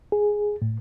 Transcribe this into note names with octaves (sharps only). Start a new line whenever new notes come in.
G#4
A2